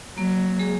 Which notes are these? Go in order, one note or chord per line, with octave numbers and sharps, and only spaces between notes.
F#3 A#3
G#3 G#4